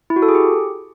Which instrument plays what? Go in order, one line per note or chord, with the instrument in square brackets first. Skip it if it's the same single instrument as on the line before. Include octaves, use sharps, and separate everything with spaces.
[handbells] E4
F#4
A4
G#4
G4